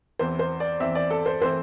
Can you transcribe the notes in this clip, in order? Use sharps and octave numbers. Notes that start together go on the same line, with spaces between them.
E2 E3 C4 C5
C5
D5
E2 E3 C4 E5
D5
A4
C5
E3 A3 C4 E4 C5